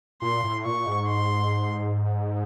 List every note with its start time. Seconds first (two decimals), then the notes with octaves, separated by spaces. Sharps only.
0.22 A#2 C6
0.44 A2
0.65 A#2 C#6
0.86 G#2
1.08 C6